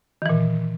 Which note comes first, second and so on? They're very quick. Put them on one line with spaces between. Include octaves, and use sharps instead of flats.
D#3 E3 A#2